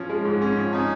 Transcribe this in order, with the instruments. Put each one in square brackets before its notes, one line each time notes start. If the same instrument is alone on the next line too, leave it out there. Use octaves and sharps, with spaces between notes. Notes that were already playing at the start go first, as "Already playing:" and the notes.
Already playing: [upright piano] F3 C#4
G#3
G#2
C#4
F3
[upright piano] C#4 [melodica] D#4